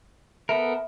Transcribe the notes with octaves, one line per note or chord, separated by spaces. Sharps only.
B3 A4 A#4 E5